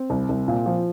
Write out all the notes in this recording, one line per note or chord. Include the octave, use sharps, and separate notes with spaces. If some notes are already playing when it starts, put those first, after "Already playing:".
Already playing: C4
C2
C2
A#2
F3